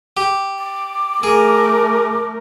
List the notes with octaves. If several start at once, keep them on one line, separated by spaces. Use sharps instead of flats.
G4
D6
A3 G#4 A#4